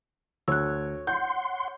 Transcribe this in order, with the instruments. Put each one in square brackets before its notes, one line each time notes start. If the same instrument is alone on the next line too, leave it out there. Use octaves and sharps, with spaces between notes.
[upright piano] D2 [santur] C#5 [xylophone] E6 F#6
[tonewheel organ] F#5 C6 [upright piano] G6